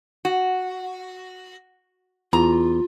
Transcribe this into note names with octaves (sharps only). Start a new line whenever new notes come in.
F#4
E2 F4 A#5